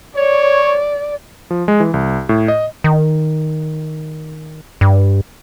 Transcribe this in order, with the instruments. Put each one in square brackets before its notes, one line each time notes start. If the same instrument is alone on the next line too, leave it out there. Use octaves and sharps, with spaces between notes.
[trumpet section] C#5 [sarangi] D5
[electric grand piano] F3
G#3
E3
C2
A2
D#5
[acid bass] D#3
G2